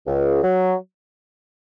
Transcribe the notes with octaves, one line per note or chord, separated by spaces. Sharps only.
C#2
F#3